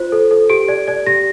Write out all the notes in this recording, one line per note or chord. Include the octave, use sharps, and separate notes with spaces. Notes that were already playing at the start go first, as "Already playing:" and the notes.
Already playing: F4 C5
A4
A4
G4 D7
D5
D5
G4 A#6